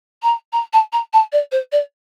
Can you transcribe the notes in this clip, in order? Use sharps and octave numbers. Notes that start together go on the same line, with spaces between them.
A#5
A#5
A5
A#5
A5
D5
C5
D5